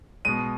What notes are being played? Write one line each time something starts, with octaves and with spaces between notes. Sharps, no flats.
B2 G#3 D#7